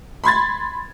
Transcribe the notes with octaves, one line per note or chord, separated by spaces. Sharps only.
B5 C6 G#6 A6